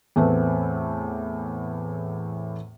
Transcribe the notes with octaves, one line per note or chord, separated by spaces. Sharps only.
E2 A2 A3 B3 C4